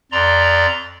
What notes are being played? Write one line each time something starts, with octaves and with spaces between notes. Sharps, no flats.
F2 D5 A#5 C6